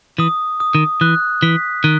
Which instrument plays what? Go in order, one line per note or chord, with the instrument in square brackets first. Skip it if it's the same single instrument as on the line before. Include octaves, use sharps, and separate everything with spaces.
[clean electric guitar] E3 [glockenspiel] D#6
[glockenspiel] D#6
[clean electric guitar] D#3
[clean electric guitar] E3 [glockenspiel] F#6
[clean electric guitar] E3 [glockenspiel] B6
[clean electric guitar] D#3 [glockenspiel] F#6